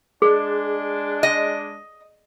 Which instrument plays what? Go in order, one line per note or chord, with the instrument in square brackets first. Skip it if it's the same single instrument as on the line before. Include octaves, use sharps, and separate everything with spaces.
[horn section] G#3 D4 [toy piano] G#4
[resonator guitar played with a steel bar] D#5